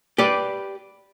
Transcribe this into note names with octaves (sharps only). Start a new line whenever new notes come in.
G4 B4 D5